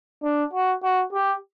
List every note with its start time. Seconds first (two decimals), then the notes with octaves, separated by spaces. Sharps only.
0.23 D4
0.53 F#4
0.83 F#4
1.13 G4